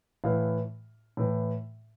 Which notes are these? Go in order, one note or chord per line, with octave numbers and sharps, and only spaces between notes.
A2 E3 F5
A2 E3